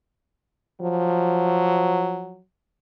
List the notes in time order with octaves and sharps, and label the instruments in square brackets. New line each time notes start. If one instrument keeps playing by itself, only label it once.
[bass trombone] F3 [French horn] F#3